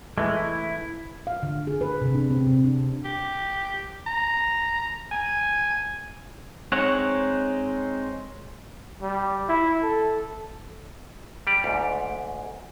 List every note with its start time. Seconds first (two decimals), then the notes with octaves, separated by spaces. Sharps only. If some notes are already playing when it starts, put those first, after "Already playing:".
0.18 E3 G#3 A3
0.36 E4
1.27 F5
1.43 D3
1.67 G#4
1.81 B4
2.02 C3
2.14 D4
2.31 C4
2.47 C3
2.64 D4
3.05 G4
4.07 A#5
5.11 G#5
6.72 G#3 C4 D#4 C#5 F#5
9.03 G3
9.49 E4
9.83 A4
11.47 G3 G4 D5
11.64 D2 G#2